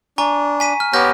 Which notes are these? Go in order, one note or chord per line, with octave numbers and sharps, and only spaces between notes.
D4 G#5 A#5 C#6
G#5 B6 D#7
F6
B3 G4 C#5 F6 G6 A#6